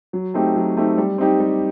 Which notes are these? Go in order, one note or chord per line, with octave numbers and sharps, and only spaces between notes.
F#3
A3 C4 D#4 G4
F#3
A3 C4 D#4 G4
G3
C4 D#4 G4
G3